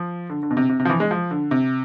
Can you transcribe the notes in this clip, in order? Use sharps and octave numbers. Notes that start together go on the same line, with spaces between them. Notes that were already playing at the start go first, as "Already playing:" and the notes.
Already playing: F3
D3
D3
B2
C3
C3
C3
F3
E3
G#3
F3
D3
C3